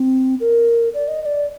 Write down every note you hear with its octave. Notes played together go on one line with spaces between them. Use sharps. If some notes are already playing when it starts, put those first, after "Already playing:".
Already playing: C4
A#4
D5
D#5
D#5
D5